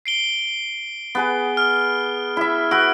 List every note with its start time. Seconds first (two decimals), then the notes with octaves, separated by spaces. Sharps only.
0.06 C7 D7 G7
1.15 B3 G#4 B4
1.57 F6
2.37 E4 E5
2.71 F#4 B4 E6 D7